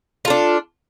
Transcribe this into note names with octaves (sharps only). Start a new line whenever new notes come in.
D4 F4 A4